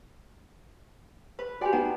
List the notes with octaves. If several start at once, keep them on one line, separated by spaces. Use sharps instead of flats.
B4 B5
F#4 G4 D5 G5 G#5
B3 D#4 F#5 A#5